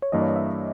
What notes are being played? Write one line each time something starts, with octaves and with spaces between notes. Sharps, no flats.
C#5
G2 E3 A#3 D#5
C#5
D#5
E5